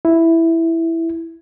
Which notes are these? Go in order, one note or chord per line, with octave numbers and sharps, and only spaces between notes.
E4